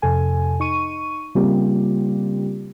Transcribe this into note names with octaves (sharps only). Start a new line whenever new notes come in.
F2 C3 A4 G#5
D#4 C#6 D#7
C#3 G3 A#3 C4 F4 G4